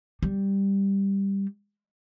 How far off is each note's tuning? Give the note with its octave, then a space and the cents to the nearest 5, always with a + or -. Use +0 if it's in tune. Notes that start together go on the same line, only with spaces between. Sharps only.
G3 +5